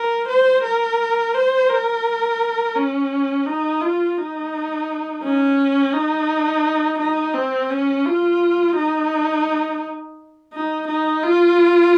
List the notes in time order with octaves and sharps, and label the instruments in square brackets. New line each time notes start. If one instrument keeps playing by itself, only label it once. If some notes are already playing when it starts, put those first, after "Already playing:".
Already playing: [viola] A#4
C5
A#4
C5
A#4
C#4
D#4
F4
D#4
C#4
D#4
D#4
C4
C#4
F4
D#4
D#4
D#4
F4